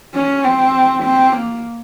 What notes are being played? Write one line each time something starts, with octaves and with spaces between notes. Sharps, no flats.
C#4
C4
C4
A#3